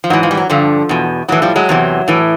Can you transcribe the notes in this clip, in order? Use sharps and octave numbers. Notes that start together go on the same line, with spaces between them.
F3
G#2 E3 F#3
F3
G3
F#3
G2 D3 F3
E2 B2
A2 E3 F#3
F3 G3
F#3 G#3
E2 C3 E3
A2 E3